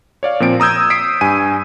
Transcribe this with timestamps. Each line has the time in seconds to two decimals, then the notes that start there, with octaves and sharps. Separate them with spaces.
0.23 C#5 D5 F5
0.40 A#2 F3 C4 D7
0.60 A#5 D#6 E6 G6 G#6
0.90 D#6 B6 C7 D7
1.21 G2 G#5 D#7